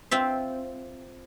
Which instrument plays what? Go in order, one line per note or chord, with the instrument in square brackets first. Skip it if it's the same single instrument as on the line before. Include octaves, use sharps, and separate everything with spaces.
[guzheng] C4 F4 E5